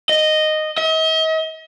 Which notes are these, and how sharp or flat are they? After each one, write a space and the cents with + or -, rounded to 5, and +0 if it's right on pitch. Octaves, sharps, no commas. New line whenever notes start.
D#5 -10
D#5 +45